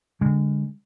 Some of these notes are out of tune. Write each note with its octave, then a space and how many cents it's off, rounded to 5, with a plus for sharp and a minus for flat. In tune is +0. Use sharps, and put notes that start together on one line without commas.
D3 -20 G#3 -30